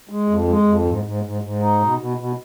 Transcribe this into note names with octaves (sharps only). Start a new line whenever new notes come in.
G#3
F2
G#3
F2
G#2
G#2
G#2
G#2
D#4
B2
B2
B2